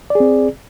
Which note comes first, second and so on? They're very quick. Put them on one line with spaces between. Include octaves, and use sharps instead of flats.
D5 G#4 C4